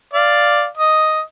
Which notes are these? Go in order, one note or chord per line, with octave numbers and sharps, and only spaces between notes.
D5 F5
D#5